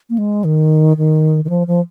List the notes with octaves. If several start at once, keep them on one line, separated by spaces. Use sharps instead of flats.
A#3
G#3
D#3
D#3
D#3
F3
F3